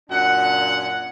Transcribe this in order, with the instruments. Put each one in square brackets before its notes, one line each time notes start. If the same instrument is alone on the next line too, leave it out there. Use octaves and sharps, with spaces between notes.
[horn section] F#2 A#2 D4 F#5